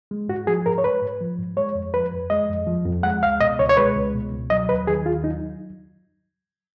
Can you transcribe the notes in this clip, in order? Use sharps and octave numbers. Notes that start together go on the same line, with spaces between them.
G#3
G#2 F#4
F3 G#4
G#2 A#4
C#5
G#3 B4
G#2
F3
G#2
G#3 C#5
F2
F3 B4
F2
G#3 D#5
F2
F3
F2
G#3 F#5
C#2 F5
B2 D#5
C#2 C#5
C#5
G#3 B4
C#2
B2
C#2
F#3 D#5
D#2 B4
D#3 G#4
D#2 F4
F#3 D#4